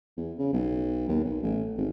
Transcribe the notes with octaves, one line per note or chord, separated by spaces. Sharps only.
E2
C#3
B1
D#2
B1
A1
G#1